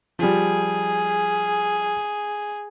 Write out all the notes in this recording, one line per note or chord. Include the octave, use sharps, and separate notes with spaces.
F3 G3 G#4